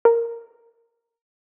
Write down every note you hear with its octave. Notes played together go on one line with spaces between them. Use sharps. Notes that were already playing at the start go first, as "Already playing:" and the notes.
A#4